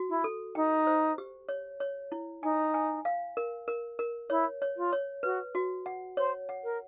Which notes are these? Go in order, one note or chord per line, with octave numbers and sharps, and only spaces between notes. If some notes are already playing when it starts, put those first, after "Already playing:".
Already playing: F#4
E4
A4
D#4 G5
C5
G4
C#5
C#5
E4
D#4 G#5
G#5
F5
A#4
A#4
A#4
E4 C#5
C#5
F4
C#5
F#4 B4
F#4
F#5
C5 C#5
F#5
A#4